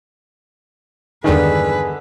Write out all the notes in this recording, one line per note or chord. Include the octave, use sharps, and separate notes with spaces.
E2 G2 D3 D#3 G#3 D4 G#4 B4